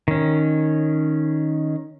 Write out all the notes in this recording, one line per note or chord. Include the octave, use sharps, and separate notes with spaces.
D#3 C#4